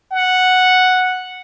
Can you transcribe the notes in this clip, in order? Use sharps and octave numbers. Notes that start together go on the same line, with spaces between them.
F#5